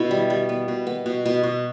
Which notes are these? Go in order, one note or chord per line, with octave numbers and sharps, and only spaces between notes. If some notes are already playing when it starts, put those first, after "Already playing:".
Already playing: B2 E4
G3
G3
B3
B2
B3
B2
B2
B2